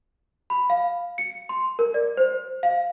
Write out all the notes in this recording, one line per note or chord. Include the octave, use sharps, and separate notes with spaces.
B5
F5
C#7
C6
A#4
D5
C5
F5